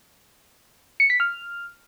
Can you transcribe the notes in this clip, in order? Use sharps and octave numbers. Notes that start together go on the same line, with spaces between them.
C#7
B6
F6